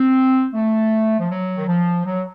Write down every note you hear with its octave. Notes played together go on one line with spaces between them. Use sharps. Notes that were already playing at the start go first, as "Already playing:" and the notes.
Already playing: C4
A3
F3
F#3
D#3
F3
F#3